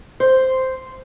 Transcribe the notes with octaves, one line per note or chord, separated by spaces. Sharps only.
C5